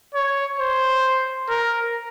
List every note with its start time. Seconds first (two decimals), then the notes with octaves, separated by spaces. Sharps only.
0.15 C#5
0.59 C5
1.49 A#4